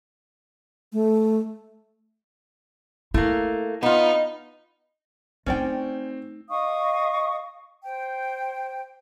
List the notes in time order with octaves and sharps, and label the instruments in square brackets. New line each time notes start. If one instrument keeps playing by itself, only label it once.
[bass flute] A3
[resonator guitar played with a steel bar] A3 A#3 [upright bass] E4
[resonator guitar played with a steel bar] B3 F4 [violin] D#4
[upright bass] A3 D#4 [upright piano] C4 [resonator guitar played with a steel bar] C#4 D5 G5
[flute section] D#5 F5 C#6 D#6
C5 G5